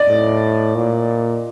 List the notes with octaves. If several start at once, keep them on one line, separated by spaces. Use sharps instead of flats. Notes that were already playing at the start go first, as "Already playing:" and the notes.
Already playing: D5 D#5
A2
A#2